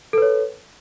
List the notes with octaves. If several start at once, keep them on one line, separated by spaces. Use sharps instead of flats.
A4 B4 C#5